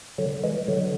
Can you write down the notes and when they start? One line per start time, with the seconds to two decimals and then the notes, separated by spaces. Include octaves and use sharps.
0.18 D3 F#3
0.44 E3 G#3
0.68 D3 F#3